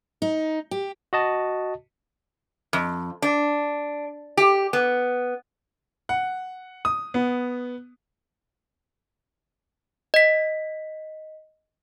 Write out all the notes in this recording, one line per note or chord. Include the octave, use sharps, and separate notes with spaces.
D#4
G4
F#4 D#5 A5
F2
D4
G4
B3
F#5
D#6
B3
D#5 B6